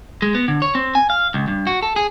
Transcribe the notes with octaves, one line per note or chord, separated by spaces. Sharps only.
G#3
B3
D3
C#5
C4
G#5
F5
C#2
G2
F#4
A4
G#4